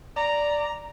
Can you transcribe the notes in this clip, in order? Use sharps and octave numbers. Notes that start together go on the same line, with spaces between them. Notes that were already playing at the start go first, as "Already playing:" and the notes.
D5 A#5